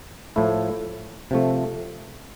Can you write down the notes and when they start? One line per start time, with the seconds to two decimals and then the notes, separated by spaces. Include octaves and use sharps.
0.36 A2 F3 A3 E4
1.31 C3 F3 A3